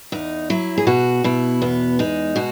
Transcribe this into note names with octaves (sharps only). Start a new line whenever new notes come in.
E2 D#4
F#3 E4
G#4
B2 F#4
B2 E4
E2 B3
G#3 D#4
B2 F#4